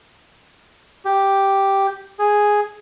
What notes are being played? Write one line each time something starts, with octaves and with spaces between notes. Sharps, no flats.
G4
G#4